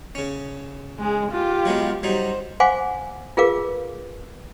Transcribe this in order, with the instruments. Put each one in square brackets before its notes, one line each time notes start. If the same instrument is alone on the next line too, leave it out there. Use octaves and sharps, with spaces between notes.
[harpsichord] C#3 C#4
[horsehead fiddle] G#3 G#4
F4 G4
[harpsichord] F#3 G#3 B3
[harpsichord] F#3 G3 D#4 [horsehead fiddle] C5
[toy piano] C5 F5 F#5 G#5 C6 D6
F4 G#4 A#4 B4 F5 D6